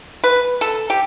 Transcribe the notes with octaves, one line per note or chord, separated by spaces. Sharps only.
B4
A4
G4